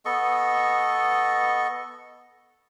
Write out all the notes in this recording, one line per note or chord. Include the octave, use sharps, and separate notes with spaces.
B3 A4 D#5 C#6